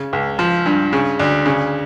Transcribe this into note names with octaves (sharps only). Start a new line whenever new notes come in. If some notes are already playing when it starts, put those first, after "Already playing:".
Already playing: C#3
C#2
F3
G2
C#3
D2
C#3